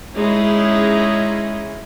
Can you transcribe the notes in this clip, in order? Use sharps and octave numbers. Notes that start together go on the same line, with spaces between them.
G#3 C#4 D#4 E4 G#4